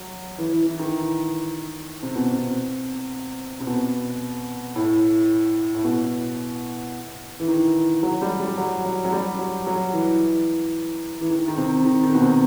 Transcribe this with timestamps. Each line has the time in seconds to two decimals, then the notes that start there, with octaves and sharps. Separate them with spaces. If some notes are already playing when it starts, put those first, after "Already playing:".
Already playing: F#3
0.38 E3
0.52 E3
0.66 E3
0.79 D#3
2.03 C3
2.15 B2
2.28 C3
3.60 C3
3.67 B2
4.76 A2
5.74 A2
5.84 B2
7.40 E3
7.48 D#3
8.03 F#3
8.22 G3
8.40 G3
8.57 F#3
8.85 F#3
9.05 F#3
9.12 G3
9.39 F#3
9.67 F#3
9.93 E3
11.21 E3
11.30 D#3
11.48 D#3
11.57 C3
11.85 D#3
12.03 D#3
12.14 B2
12.22 C3